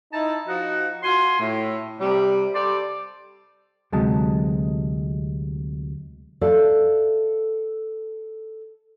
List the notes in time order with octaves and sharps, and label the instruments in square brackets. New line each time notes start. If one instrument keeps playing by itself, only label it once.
[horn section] D#4 E4 A5
F3 D#4 F#4
F4 F#4 G#5 C6
A2
C3 G3
G3 A4 C5 D5
[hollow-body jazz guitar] D2 C3 F#3 G#3 A5
[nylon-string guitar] A4 D5 E5 F5